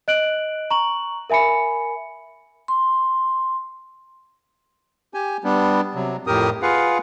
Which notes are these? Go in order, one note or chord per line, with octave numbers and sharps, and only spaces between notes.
D#5 F#6 D7 F#7
A#5 C#6 F#7
A#4 E5 G#5 B5 C#7
C6
G4 G#5
G3 B3 D4
C3 F#3
F2 A2 G4 A#4 D#6
F4 G#4 B4 F5 F#5